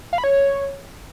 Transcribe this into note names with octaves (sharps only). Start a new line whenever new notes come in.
F5
B5
C#5